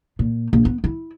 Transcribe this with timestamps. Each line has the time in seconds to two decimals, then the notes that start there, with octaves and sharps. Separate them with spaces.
0.19 A#2
0.53 A#1
0.65 B3
0.84 E4